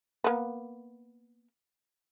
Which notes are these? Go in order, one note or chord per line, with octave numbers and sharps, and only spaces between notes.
A#3 B3